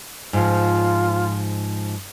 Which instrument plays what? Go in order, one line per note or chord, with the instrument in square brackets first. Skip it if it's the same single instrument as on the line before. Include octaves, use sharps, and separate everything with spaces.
[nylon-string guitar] G#2 F3 [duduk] F4